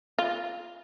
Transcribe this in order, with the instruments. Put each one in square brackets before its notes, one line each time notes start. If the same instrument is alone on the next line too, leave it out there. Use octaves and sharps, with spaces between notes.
[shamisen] F4